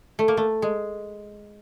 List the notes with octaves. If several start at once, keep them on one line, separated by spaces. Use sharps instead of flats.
A3
A#3
A3
G#3